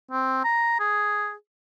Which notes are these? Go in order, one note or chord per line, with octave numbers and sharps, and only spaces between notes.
C4
A#5
G#4